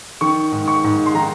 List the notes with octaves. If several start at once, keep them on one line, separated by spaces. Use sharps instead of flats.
D#3 C#6
G#2
C#6
G#2
C6
D#3 A#5